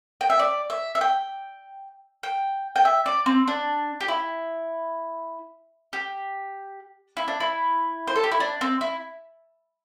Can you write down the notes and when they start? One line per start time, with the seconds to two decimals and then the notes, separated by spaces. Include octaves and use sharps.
0.21 G5
0.30 E5
0.39 D5
0.70 E5
0.95 E5
1.01 G5
2.23 G5
2.76 G5
2.85 E5
3.06 D5
3.26 C4
3.48 D4
4.01 G4
4.08 E4
5.93 G4
7.17 E4
7.28 D4
7.40 E4
8.07 C5
8.16 A4
8.24 G4
8.32 E4
8.40 D4
8.61 C4
8.81 E4